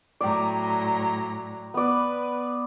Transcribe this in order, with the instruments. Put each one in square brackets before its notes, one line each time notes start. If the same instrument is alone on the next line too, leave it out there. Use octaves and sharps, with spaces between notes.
[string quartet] A2 F#3 A#5 [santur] D5 G5
[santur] B3 D5 [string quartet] B4